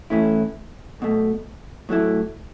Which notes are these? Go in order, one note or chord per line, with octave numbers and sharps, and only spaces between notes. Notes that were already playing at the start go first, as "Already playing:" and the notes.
A2 E3 A3 C#4 E4
B1 B2 A3
A2 F#3 A3 E4